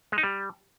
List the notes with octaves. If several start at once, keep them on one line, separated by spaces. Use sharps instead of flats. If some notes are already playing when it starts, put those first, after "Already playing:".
G#3
D#4
G3